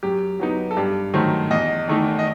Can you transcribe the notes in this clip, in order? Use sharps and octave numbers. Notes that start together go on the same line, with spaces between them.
F#2 G4
F#3 B3 D#4
A4
G2 G4
D#3 F#3 A3 C5
E2 D#5
D#3 A3 D#4
D#5